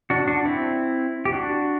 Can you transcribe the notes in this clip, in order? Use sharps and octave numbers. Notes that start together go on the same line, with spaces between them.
D4 F#4
D4 F#4
C4 E4
G4
D4 F#4